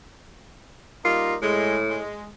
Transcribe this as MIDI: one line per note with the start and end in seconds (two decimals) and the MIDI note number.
1.05 1.36 55
1.05 1.36 58
1.05 1.36 63
1.05 1.34 65
1.42 2.06 45
1.42 1.78 56
1.88 2.27 56